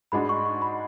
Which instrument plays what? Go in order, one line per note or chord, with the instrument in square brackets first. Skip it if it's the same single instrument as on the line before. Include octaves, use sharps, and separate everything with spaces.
[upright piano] G#2 G#3 D4 F#4 [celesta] B5
[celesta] C#6
C#6
B5